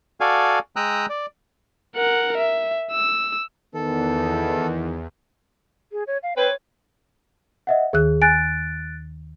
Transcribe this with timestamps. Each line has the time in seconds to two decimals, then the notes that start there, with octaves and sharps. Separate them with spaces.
0.20 F#4 A4 D5 F5 G#5
0.76 G#3 G5 A#5 D#6 E6 F#6
1.09 D5
1.96 A#4 F#5
2.38 E5
2.92 E6
3.74 E2 D#3 B3 A4
5.92 G#4
6.07 C#5
6.23 F5
6.36 C4 B4 C#5
7.67 D#5 E5 F#5
7.93 D#2 D#3 G#4 F#6
8.22 G#5 F#6 A6 D7